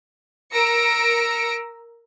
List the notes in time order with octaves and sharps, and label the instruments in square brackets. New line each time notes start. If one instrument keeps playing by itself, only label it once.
[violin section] A#4 A#5 E6 A#6 C#7 D7